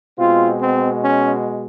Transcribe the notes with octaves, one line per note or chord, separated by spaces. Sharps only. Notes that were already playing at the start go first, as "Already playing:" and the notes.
B2 G#3 C4 F4
C4
C#4